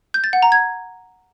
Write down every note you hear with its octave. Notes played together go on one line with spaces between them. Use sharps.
G6
A6
F#5
A#5
G#6